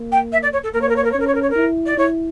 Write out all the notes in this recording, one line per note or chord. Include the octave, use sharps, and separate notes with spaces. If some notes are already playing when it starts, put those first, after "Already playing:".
Already playing: A#3
G5
E5
D5
C#5
A4
A#3 A#4
C#5
A#4
C#5
A#4
C#5
C#4
A#4
C#5
A#4
C#5
A#4
E4
D5
E4 C#5